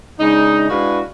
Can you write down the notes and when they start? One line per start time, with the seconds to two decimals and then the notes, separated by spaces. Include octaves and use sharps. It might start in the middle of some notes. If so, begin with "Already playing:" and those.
0.19 C#3 G#3 D4 D#4
0.70 G#3 D4 E4 F#4 B4 F5